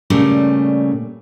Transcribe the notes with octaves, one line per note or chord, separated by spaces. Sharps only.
A#2 C#3 G3 A3